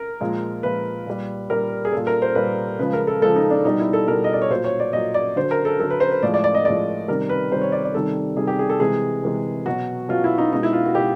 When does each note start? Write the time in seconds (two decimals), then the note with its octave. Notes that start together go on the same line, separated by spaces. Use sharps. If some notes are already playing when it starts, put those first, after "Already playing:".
Already playing: A#4
0.21 A#2 F3 G#3
0.63 A#2 F3 G#3 B4
1.07 A#2 G3
1.49 A#2 G3 A#4
1.85 G#4
1.92 A#2 G3 A4
2.07 A#4
2.22 C5
2.35 A#2 G3 B4
2.79 C#3 F3 G#3 B4
2.93 A#4
3.07 A4
3.22 C#3 F3 G#3 A4
3.36 D#4
3.51 D4
3.65 B2 G3 D#4
3.79 E4
3.93 A4
4.08 B2 G3 A#4
4.24 D#5
4.33 D5
4.42 C#5
4.50 A#2 F#3 C5
4.64 C#5
4.80 D5
4.93 A#2 F#3 D#5
5.14 D5
5.36 D3 F#3 C5
5.51 A#4
5.65 A4
5.79 F#3 A4
5.83 D3
5.90 B4
6.00 C5
6.11 B4
6.23 A2 F3 G#3 D5
6.34 D5
6.44 D5
6.54 D#5
6.65 A2 F3 G#3 D5
7.08 C3 D#3 G3 A#4
7.29 B4
7.52 C3 D#3 G3 C5
7.61 C#5
7.72 D5
7.84 D5
7.94 C3 D#3 G3 A4
8.37 C3 D#3 G3 G#4
8.47 G4
8.59 G#4
8.69 A4
8.80 C3 E3 G#3 G#4
9.23 C3 E3 G#3
9.66 B2 F#3 F#4
10.09 B2 F#3 F4
10.24 E4
10.38 D#4
10.52 B2 G#3 D#4
10.63 E4
10.73 F4
10.85 F#4
10.95 B2 G#3 G4